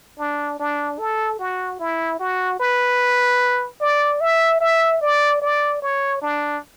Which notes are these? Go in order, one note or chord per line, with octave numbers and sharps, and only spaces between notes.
D4
D4
A4
F#4
E4
F#4
B4
D5
E5
E5
D5
D5
C#5
D4